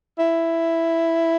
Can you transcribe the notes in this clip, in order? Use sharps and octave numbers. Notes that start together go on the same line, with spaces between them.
E4